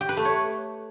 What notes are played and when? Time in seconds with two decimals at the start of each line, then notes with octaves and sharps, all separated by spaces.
0.01 G4
0.09 B4
0.17 A3
0.25 C#5